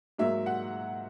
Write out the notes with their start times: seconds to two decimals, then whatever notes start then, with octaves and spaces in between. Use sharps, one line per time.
0.18 G#2 F#3 A#3 E5
0.46 F#5